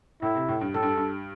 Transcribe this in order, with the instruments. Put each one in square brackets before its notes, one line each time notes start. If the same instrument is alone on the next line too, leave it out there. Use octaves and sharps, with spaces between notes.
[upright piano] A2 [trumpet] E4
[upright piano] C3
A2
G2
[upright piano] A2 [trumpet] A4
[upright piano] G2
G2